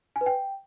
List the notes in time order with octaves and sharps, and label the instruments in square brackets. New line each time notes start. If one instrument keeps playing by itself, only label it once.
[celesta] G#5
B4
G5